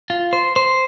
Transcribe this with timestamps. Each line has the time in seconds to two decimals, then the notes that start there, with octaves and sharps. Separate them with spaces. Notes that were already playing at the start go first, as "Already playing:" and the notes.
0.10 F4
0.33 C5
0.56 C5